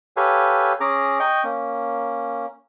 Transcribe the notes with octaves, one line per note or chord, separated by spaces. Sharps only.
G4 A4 B4 C#5 F5 G#5
C#4 G#4 A#5 D6
D#5 G5 C#6
A#3 C#4